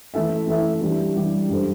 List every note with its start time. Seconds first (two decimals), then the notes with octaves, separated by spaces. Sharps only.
0.14 E3 A3 E4 A4 E5
0.47 E3 A3 E4 A4 E5
0.81 E3 G3 D4 G4
1.16 E3 G3 D4 G4
1.49 G2 G3 D4 A4 C5